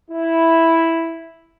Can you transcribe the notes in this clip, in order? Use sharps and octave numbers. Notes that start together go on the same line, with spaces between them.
E4